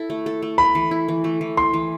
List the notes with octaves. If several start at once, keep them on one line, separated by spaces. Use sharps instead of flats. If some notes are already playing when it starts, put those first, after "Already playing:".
Already playing: E4 A4
A3
A4
A3
A3 B5
E3
E4
E3
A3
E3
E4 C6
E3